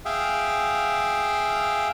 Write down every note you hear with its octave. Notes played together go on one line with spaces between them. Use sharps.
G#4 E5 F5 G5